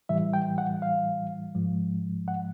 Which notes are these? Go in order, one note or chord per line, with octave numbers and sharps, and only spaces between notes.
A2 E3 G3 E5
G5
F#5
F5
G#2 F3 G#3
F#5